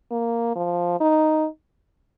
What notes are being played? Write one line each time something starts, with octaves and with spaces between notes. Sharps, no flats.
A#3
F3
D#4